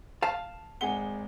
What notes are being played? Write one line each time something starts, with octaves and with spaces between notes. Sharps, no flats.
F5 A5
G#1 G#3 F#5 G#5 G7